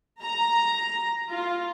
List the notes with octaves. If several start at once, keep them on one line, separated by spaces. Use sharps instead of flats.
A#5
F4